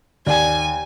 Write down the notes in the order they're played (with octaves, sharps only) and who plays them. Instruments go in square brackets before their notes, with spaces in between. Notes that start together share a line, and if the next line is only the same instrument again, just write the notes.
[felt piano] D#2 [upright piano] D5 [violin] G#5